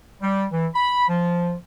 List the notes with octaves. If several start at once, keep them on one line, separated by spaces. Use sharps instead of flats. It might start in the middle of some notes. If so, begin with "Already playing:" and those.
G3
E3
B5
F3